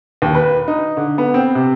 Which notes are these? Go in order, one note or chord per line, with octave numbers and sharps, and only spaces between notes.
D#2
B4
D#4
D3
B3
C4
C3